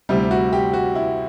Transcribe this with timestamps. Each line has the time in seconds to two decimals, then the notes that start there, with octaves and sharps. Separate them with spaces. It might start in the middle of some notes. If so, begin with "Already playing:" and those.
0.09 D2 C3 G3 E4
0.31 F#4
0.53 G4
0.74 F#4
0.95 E4